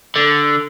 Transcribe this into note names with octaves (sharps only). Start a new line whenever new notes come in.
D3